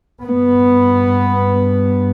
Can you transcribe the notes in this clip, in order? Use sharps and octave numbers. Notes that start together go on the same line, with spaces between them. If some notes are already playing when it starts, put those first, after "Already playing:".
G2 B3